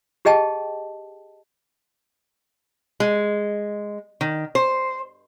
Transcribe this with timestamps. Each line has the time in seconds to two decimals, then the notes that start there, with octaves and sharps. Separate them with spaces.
0.25 G4 G#4 D#5 G5 A5
3.00 G#3
4.21 D#3
4.55 C5